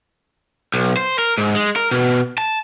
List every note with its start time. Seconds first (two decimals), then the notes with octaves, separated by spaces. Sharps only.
0.74 B1
0.97 C5
1.19 A#4
1.38 G#2
1.56 G#3
1.76 A#4
1.91 B2
2.38 A5